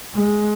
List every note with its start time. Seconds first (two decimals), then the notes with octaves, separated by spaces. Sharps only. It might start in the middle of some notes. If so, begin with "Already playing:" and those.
0.14 G#3